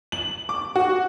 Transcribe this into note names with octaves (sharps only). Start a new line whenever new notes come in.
F#7
D6
F#4